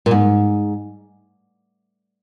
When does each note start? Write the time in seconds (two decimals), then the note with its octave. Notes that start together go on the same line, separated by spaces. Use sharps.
0.06 A#2
0.11 G#2